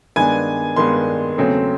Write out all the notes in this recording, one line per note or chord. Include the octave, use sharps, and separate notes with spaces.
G2 D#3 G#3 B3 D4 G#5
G2 D#3 G#3 B3 D4 C6
E2 C#3 F#3 A3 C4